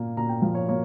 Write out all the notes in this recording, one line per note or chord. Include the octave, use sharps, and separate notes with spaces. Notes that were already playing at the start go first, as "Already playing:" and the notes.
Already playing: A#2 A#3
A#2 A#5
G5
F3 F5
C#5
A#3 C#5